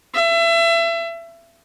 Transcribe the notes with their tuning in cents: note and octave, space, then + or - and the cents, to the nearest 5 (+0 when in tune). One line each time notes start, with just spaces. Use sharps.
E5 +30